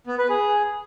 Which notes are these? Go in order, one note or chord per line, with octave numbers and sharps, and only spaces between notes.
B3
B4
G#4